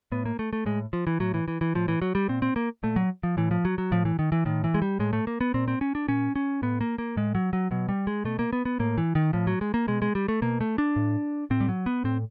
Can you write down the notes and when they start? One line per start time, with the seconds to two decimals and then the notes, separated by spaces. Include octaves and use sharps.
0.12 A2 B3
0.26 A#3
0.39 A3
0.53 A3
0.66 A2 G#3
0.93 F3
1.07 E3
1.20 A2 F#3
1.34 E3
1.48 E3
1.61 E3
1.75 A2 F3
1.88 E3
2.02 F#3
2.15 G3
2.29 A#2 C4
2.42 C4
2.56 A#3
2.83 A#2 A3
2.96 F#3
3.23 F3
3.37 A2 E3
3.51 F3
3.65 F#3
3.78 F#3
3.91 A2 F3
4.05 E3
4.19 D#3
4.32 E3
4.45 A2 D#3
4.64 E3
4.74 G#3
4.82 G3
4.99 A2 G#3
5.13 A3
5.27 A#3
5.41 B3
5.54 A#2 C4
5.68 C4
5.81 C#4
5.95 D4
6.08 A#2 C#4
6.36 C#4
6.62 A2 B3
6.81 A#3
6.98 A#3
7.17 A2 G#3
7.35 F#3
7.53 F#3
7.71 B2 F#3
7.89 G3
8.07 G#3
8.25 B2 A3
8.39 A#3
8.53 B3
8.65 B3
8.79 A2 A#3
8.98 E3
9.15 D#3
9.33 A2 F3
9.47 F#3
9.61 G#3
9.74 A#3
9.88 B2 G#3
10.02 G#3
10.15 G3
10.28 A3
10.42 B2 A#3
10.61 A3
10.78 D4
10.96 A2
11.50 A2 C4
11.60 G3
11.69 F#3
11.86 B3
12.04 A2 C4